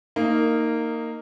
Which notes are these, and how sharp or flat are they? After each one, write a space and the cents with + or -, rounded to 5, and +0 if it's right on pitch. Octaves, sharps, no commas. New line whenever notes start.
A#3 -15 D#4 +0